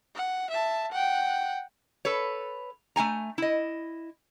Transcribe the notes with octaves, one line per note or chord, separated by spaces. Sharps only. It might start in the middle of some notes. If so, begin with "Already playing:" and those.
F#5
E5 A5
F#5 G5
A4 B4 C#5
A3 D#4 G#5 A#5
E4 D#5